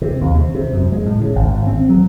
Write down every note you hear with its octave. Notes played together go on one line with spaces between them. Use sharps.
C3
D#2
C3
C3
F#2
G#3
A2
C#3
G#1
C4
F#3